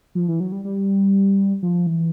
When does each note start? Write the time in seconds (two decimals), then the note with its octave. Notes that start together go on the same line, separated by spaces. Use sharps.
0.15 F3
0.28 E3
0.40 F#3
0.52 G3
0.65 G3
1.63 F3
1.87 E3